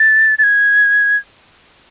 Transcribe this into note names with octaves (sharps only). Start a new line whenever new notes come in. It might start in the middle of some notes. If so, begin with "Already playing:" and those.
Already playing: A6
A6
G#6